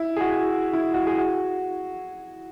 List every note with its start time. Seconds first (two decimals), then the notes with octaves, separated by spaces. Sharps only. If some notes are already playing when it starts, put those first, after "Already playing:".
Already playing: E4
0.16 G#4
0.21 F#4
0.73 E4
0.94 F#4
1.07 G#4
1.18 F#4